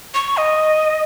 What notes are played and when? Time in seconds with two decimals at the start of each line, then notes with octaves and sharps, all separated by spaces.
0.14 C#6
0.37 D#5